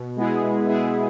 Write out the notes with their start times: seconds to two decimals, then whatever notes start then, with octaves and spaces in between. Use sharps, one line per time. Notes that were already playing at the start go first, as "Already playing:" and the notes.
Already playing: B2
0.16 G#3 B3 E4 G#4
0.43 B2
0.69 G#3 B3 E4 G#4